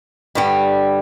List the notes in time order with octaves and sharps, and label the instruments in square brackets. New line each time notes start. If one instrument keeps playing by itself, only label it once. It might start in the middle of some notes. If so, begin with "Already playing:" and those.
[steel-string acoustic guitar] G2 D3 G3